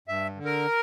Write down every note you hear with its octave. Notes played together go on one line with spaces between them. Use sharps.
G2 E5
D3
A#4